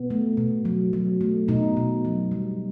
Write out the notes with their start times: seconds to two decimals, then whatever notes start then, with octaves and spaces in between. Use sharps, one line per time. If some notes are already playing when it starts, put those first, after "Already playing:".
Already playing: B2 B3
0.10 A3
0.37 B2
0.65 F#3
0.93 F#3
1.21 A3
1.48 B2 D#4
1.77 B2
2.05 F#3
2.32 G3